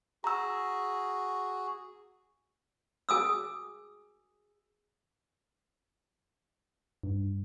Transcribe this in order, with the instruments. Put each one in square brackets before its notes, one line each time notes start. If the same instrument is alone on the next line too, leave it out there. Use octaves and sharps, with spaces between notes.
[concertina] F#4 G#4 [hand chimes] A#5 E6
[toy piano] G#4 G#5 D#6 E6
[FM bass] G2